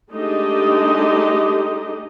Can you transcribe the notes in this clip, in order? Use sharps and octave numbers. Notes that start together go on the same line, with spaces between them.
G#3 A3 D4 D#4 G4 D#5